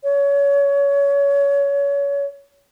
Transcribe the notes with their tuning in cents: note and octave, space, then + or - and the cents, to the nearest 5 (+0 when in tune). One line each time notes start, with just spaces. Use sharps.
C#5 +25